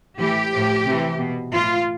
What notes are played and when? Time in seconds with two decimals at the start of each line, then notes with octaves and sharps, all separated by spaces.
0.19 A2 E3 G4
0.52 A2 F3
0.86 C3 E3
1.19 B2
1.52 A2 E3 F4